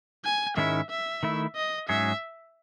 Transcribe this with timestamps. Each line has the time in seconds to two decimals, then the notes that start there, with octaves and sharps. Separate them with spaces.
0.25 G#5
0.57 G#2 D#3 G#3 C#4 E4 E5
0.90 E5
1.23 D#3 A3 E4
1.56 D#5
1.88 G#2 F#3 C#4 G#4 E5